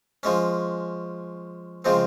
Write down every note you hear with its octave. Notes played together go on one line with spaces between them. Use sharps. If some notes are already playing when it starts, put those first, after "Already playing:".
F3 G#3 C#4
C#3 F3 G#3 C4